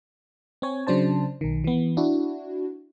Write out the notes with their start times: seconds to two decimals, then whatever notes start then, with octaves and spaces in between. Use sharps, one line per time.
0.62 C4 C#5 G#5
0.87 C#3 F#3 D4 C5 A5
1.41 B1 D#3
1.64 E3 B3
1.97 D4 E4 F#4